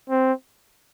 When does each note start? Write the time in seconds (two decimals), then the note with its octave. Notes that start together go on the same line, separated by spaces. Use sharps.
0.10 C4